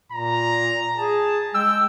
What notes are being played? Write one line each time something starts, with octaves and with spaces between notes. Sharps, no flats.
A#2 A#5
G#4 A5
G#3 G5 E6